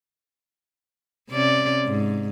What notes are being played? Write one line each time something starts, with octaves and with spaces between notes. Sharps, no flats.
C3 C#4 D5
G#2